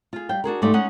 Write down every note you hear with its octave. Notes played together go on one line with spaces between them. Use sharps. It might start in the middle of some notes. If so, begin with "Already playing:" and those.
F4 G#4
G3 F5 G5
D4 F#4 G#4 A#4
G#2 G3 A3 F4 D5
G#3 C#4 D#4 D#5 F#5